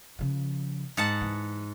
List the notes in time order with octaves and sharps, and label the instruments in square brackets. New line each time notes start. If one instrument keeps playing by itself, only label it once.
[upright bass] C#3 F3
[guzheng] G#2 F#5 A5
[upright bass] E3